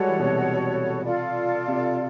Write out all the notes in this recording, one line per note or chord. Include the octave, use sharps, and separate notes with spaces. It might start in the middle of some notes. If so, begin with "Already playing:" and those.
Already playing: G3 G#3 F#4 A4 C#5 F#5
E3
B2
C3
F4 A4 D5
C3